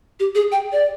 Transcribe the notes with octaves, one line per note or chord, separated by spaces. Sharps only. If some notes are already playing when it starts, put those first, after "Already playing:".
G4
G#4
G5
D5